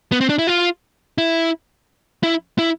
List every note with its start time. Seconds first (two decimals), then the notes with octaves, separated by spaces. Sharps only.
0.12 B3
0.21 C4
0.30 D4
0.39 E4
0.47 F4
1.18 E4
2.23 E4
2.59 E4